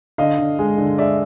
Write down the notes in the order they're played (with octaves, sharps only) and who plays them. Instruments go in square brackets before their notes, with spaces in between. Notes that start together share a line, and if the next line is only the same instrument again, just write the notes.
[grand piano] D3 [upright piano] D#5 F5
[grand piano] D3
G#3
D3
[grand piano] G#3 [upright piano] D5 E5